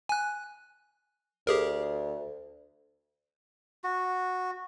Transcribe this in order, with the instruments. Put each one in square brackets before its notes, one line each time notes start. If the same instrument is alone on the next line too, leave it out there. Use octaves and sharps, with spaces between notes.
[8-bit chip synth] G#5 F#6
[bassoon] D2 [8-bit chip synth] G4 G#4 A#4
[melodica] F#4